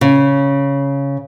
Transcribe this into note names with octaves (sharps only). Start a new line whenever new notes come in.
C#3